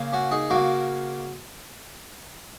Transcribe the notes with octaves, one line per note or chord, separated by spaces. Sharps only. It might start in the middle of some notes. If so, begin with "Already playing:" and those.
Already playing: C#3 A#3
C#4 F#4
D#4 G#4
C#3 A#3 F#4 A#4